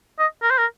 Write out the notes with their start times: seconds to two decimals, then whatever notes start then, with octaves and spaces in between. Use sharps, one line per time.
0.19 D#5
0.42 A#4
0.51 C5
0.58 A#4